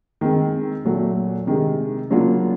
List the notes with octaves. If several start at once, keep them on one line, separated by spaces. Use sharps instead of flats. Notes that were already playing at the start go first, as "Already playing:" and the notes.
D#3 G#3 C4
A#2 F#3 A3
C3 D#3 G#3
C#3 F#3 A#3 D4 F4